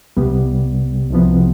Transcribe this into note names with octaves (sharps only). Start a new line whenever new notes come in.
C2 C3 G3 B3
C2 C3 F3 B3